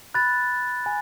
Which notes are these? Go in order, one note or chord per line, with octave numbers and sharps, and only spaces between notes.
B5 F#6 A6
G#5